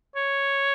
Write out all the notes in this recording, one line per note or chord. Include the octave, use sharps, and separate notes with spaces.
C#5